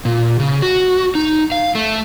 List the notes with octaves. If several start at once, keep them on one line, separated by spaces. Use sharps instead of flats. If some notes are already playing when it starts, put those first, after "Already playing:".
A#2
C#3
F#4
D#4
F5
A3